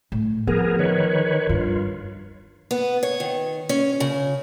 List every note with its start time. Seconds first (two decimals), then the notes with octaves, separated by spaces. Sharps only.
0.12 A2
0.47 F3 B3 G#4 A#4
0.79 D#3 B4 C#5
1.49 G2 F4
2.71 B3
3.03 C#5
3.20 D#3
3.69 C#4
4.00 C#3